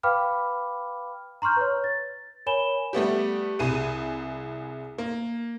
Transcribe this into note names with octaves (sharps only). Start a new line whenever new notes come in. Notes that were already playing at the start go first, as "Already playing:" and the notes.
B4 F5 G5 B5 D6 F6
A#5 C6 C#6 F6 G6
B4 C#5
A6
A#4 C#5 G#5 B5 E7 G7
G3 A3 B3 G4
C2 G#4 D#7
A#3